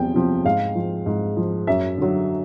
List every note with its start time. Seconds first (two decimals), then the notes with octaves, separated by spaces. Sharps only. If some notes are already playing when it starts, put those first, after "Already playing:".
Already playing: E2 C3 F3 G5
0.14 C3 F3
0.45 G#2 F5
0.75 F3
1.06 G#2
1.37 F3
1.67 F#2 E5
1.98 D3 F#3